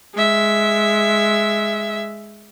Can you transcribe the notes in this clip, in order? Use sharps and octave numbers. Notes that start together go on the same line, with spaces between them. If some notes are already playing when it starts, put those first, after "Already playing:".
G#3 E5